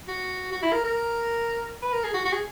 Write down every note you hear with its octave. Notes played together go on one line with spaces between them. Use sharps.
F#4
F#4
E4
A#4
A#4
B4
A#4
G#4
F#4
F#4
G#4